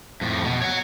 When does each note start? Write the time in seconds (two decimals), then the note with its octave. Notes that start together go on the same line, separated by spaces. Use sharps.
0.21 F2 A2
0.44 B2
0.62 C#5 F#5